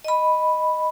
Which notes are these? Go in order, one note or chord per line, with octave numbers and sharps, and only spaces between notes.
D#5 B5